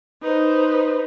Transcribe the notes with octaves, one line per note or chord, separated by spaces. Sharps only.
D#4 B4 C5